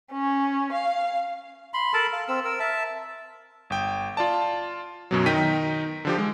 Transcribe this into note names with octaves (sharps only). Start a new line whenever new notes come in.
C#4
F5
B5 C6
A4 A#4 A5 B5
F5
C4 E6
A#4 E6
E5 A5
G1 G5
F4 D5 A5
F#2 B2 F#3
D#3 D#4 G5 A#5 B6 D#7
D3 F3 G4
G#3